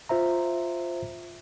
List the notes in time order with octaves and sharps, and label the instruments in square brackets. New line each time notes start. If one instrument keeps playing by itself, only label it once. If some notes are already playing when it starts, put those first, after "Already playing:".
[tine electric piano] F4 C5 E5 A#5